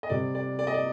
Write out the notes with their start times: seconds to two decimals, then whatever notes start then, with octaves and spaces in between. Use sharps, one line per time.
0.03 D#5
0.10 C3 G3 D5
0.35 D5
0.59 D5
0.67 D#5
0.74 D5